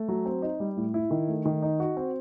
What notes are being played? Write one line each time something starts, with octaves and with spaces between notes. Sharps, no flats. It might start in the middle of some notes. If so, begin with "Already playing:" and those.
Already playing: A3
F#3
C4
D#4
G3
A2
E4
D#3
A3
D#3
D#4
F#4
C4